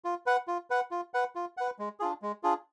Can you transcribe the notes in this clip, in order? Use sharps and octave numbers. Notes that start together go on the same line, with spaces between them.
F4
B4 F#5
F4
B4 F#5
F4
B4 F#5
F4
B4 F#5
G#3
D4 F4 G#4
G#3
D4 F4 G#4